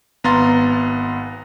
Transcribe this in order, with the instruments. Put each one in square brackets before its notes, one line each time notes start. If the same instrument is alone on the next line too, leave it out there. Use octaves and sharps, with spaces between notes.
[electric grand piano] G#1 B3 F5 A#5 C6 A6